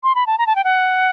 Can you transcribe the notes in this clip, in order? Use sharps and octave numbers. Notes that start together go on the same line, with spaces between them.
C6
B5
A5
A#5
A5
G5
F#5